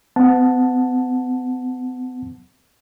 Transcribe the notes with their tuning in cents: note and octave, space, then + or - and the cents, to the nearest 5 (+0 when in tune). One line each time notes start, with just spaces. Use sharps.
B3 +45 F#5 -15 A5 +0